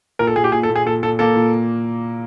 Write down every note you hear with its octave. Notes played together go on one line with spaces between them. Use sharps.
A#2 A#4
A4
A#2 G#4
G4
A#2 G#4
A4
A#2
G#4
A#2 A4
A#2 A4
A#3 A4
A#2